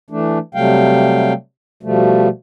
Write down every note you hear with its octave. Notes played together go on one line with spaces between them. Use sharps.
E3 A3 D4
C3 F#3 G3 A3 F5 G5
B2 F3 G3 A3